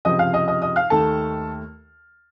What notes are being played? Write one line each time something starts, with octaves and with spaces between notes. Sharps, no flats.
C#2 C3 F3 D#5 D#6
F5 F6
D#5 D#6
D#5 D#6
D#5 D#6
F5 F6
D#2 D#3 A3 A4 A5